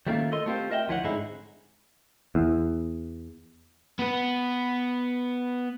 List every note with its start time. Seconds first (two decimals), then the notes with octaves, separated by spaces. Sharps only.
0.07 D#3 G3 A3 A#3 C#4 F4
0.32 A4 A#4 D#5 C6
0.46 A3 C4 F4 G4 C5
0.71 A#4 D#5 E5 F#5 G5
0.88 D2 F3 E4 C#5 F#5
1.04 G#2 D3 C4 D#4 E4 G#4
2.35 E2
3.99 B3 B4